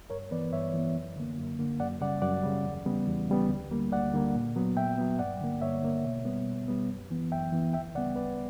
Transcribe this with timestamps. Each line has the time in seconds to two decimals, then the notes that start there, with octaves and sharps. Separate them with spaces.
0.10 G2 A#4 C#5
0.31 E3 B3 B4 D5
0.53 G2 C#5 E5
0.73 E3 B3
0.96 F#2
1.16 D3 A#3
1.38 F#2
1.59 D3 A#3
1.80 F#2 D5 F#5
2.01 C#3 G3 D5 F#5
2.22 F#2 D5 F#5
2.43 C#3 G3
2.65 E2
2.86 C#3 G3 B3
3.07 E2
3.28 C#3 G3 B3
3.49 D2
3.71 D3 G3 A#3
3.92 D2 D5 F#5
4.14 D3 G3 A#3
4.35 A#2
4.56 F#3 B3
4.76 A#2 E5 G5
4.98 F#3 B3
5.19 G2 D5 F#5
5.41 D3 A#3
5.61 G2 C#5 E5
5.82 D3 A#3
6.04 B2
6.25 G3 B3
6.47 B2
6.68 G3 B3
6.89 F#2
7.11 E3 B3
7.32 F#2 E5 G5
7.53 E3 B3
7.73 D2 E5 G5
7.95 C#3 G3 B3 D5 F#5
8.16 D2 B4 D5